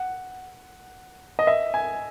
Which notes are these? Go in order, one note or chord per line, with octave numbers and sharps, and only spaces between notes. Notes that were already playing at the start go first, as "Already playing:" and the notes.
Already playing: F#5
D#5
E5
G#5